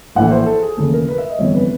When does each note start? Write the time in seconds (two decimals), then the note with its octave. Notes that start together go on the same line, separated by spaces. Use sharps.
0.15 A#1 A2 E3 F#5
0.31 C5
0.46 A4
0.62 G#4
0.77 F1 D#2 C#3 E3 A4
0.93 A#4
1.08 B4
1.18 E5
1.29 D#5
1.39 G1 F2 C3 E3 C#5
1.54 B4